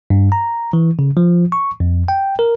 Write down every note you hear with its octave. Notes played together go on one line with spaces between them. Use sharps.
G2
A#5
E3
C#3
F3
C#6
F2
G5
A#4